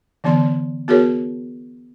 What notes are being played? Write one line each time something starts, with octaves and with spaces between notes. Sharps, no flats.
D3 E3 B3 D5 C6
B3 F#4 G#4 A#4 C#5